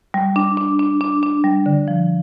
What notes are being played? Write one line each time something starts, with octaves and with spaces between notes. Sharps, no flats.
G3
D4
D4
D4
D4
D4
G3
D3
F3